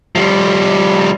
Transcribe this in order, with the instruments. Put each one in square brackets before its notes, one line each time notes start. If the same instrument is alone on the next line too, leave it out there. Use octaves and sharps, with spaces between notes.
[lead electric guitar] F3 G3